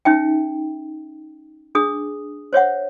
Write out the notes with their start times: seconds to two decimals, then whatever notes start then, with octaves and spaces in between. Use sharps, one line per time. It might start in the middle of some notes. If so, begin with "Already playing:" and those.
0.05 C#4 D#4 E5 G5
1.75 D4 G#4 D#6
2.53 C5 C#5 E5 F#5